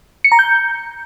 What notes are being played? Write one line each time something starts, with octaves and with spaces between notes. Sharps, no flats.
C#7
A#5
G6